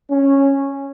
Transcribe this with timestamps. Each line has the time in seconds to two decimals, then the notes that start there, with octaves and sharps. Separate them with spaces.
0.10 C#4